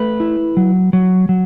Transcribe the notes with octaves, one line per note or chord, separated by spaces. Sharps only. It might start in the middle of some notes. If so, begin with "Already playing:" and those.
Already playing: A3 B4
E4
F#3
F#3
F#3